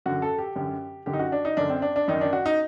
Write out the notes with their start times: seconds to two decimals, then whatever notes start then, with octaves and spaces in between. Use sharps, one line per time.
0.06 F#2 D3 F#4
0.22 A4
0.38 G4
0.56 F#2 D3 G4
1.06 F#2 D3 G4
1.13 D#4
1.19 F#4
1.32 D4
1.45 D#4
1.57 F#2 D3 D4
1.70 C4
1.82 D4
1.96 D4
2.08 F#2 D#3 D#4
2.21 D4
2.33 F#4
2.46 D#4